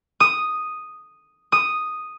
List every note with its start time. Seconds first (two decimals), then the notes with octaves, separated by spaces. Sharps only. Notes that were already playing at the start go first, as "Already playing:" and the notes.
0.20 D#6
1.52 D#6